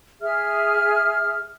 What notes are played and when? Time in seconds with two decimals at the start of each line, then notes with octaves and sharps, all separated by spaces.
0.21 G#4 E5 F6